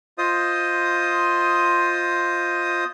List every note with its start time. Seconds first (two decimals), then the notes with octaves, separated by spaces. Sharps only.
0.18 F4 C5 D#5 D#6